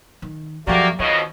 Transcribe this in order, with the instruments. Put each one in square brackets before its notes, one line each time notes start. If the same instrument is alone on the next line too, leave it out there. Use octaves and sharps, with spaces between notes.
[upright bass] D#3
[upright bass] F#2 F3 [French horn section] A3 A#3 [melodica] F#4 G4 D5
[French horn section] F2 B2 D#5 [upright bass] D#3 [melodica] C#5